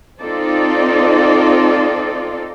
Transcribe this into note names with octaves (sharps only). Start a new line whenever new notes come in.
C4 D#4 F4 A4 D5